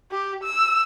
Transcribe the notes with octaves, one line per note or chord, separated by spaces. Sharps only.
G4
E6